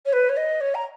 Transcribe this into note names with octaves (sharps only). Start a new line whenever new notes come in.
C#5
B4
C#5
D#5
C#5
A#5